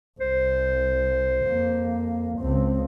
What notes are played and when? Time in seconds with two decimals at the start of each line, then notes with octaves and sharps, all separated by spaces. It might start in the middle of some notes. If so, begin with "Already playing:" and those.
0.20 C2 C5
1.46 F2 A#3
2.39 C#2 C4